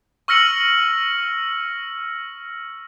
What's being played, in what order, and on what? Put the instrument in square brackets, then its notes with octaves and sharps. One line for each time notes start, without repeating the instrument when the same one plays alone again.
[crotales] C#6 E6 F6 A#6 C#7 F#7